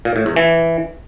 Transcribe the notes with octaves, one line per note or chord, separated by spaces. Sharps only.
A#2
A2
E2
E3